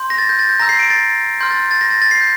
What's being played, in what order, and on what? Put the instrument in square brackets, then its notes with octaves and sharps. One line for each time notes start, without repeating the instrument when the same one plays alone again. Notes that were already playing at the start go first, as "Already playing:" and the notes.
Already playing: [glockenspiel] C6 G6
A#6
A6
G6
A6
G6
A#5 E6 G6 A#6
C7
D7
A6
C6 F6 G6
A6
A6
A#6
A6
A6
C7
G6